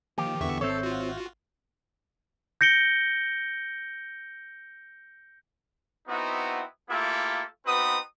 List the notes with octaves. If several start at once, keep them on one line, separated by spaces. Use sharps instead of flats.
D#3 F3 A#3 G4
E2 D3 E3 B3 E5 C#6
G#1 C4 A4 C5 C#5 E5 G6
F4 F#4
G6 A#6 C#7 D7 G7
B3 C4 D#4 E4 F#4 D#6
A3 A#3 E4 F4 G4 A4
B3 C4 D#4 F#4 B4 D#6